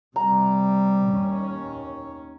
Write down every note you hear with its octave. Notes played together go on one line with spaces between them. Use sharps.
C3 G3 A#5
D#2 C#4